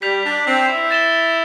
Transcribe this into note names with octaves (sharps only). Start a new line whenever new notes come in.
G3 G6 B6 F7
D4
C4
E4
A6 E7 G7